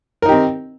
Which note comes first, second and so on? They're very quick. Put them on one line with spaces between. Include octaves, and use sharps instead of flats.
A#4 D#4 G4 C4